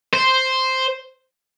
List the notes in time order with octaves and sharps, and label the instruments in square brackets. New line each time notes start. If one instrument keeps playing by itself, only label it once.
[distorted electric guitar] C5